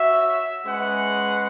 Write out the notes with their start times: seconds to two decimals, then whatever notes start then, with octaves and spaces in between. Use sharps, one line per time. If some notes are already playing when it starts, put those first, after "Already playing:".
Already playing: F#4 C#5 E5
0.65 G#3 C#4 G#4 B4 F#5